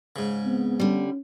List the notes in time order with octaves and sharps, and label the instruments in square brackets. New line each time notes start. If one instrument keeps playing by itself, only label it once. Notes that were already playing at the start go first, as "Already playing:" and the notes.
[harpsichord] G#2 C#3
[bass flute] B3 [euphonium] C4
[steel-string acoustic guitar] D3 G3 [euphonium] C#4